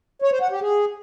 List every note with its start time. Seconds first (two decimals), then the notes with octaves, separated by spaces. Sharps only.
0.22 C#5
0.32 C5
0.41 F#5
0.51 G4
0.61 G#4